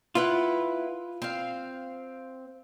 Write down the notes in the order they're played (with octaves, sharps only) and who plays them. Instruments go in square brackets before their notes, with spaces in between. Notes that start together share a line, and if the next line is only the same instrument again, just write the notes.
[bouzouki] E4 B4 F#5 [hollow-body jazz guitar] F4
[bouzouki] C4 F5